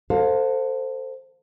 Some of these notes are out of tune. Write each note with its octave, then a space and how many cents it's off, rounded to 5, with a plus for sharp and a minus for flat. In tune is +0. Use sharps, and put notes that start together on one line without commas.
A4 +25 C5 +0 F5 +30